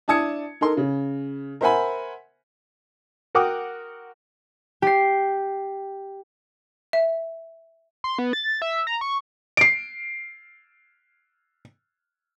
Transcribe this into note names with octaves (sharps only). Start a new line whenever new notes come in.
D4 E4 A5 D#6 G#6 C#7
D#4 A4 A#4 C6
C#3
A#4 C5 E5 F#5 G#5 B5
F#4 A#4 F#5 G5 D6 D#6
G4 C7
E5
C6
B3
A6
E5
A#5
C#6
C7 D7